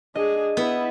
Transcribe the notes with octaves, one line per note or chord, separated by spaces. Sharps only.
D4 G#4 D#5
B3 E4